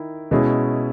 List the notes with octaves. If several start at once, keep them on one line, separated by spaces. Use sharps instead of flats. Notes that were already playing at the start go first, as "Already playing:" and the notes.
Already playing: D#3 E4
B2 G#3 C#4 E4 G#4